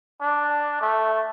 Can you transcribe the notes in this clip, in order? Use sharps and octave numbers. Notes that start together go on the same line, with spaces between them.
D4
A3